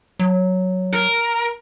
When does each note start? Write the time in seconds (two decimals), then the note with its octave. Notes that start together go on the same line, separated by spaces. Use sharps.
0.20 F#3
0.93 A#4